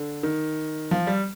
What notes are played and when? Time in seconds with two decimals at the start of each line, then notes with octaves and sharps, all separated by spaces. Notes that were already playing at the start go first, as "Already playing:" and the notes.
Already playing: D3
0.23 D#3
0.91 F3
1.07 G3